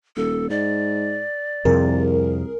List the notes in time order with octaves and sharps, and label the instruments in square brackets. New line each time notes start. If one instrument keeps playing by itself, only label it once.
[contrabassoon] D#1 [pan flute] A4
[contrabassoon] G#2 [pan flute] D5
[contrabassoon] C2 [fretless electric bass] F2 C3 [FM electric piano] G#4 A#4